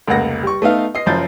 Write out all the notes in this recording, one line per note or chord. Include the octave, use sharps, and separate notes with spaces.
F1 C#2 A#3 F#5 A#6
G3 C#6
A3 B3 D#4 F5
D#5 C7
F#1 F#2 F3 G6 A6